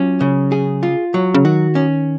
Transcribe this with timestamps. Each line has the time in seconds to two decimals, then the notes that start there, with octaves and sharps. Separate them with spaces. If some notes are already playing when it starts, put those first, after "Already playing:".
Already playing: F#3 C#4 F4
0.21 C#3
0.52 G#4
0.83 F4
1.14 F#3
1.34 C#3
1.45 D#3 F#4
1.75 C#4